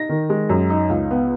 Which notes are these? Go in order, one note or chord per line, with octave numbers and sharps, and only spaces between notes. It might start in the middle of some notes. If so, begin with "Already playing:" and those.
Already playing: D#4 A#6
D#3
G#3
F#2
D#4
C#2
B3